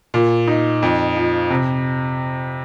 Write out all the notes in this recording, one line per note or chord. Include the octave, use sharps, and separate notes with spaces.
A#2
D#4
F2
F3
C3